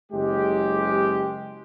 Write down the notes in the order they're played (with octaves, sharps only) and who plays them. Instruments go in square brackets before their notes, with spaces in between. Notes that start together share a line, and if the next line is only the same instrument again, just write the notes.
[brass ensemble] F#1 G#3 G4